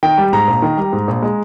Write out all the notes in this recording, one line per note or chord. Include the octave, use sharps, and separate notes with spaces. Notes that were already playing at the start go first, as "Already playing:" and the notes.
D#3 G5
G3
G#2 A#5
A#1
D#3
G3
G#2
A#1
G#3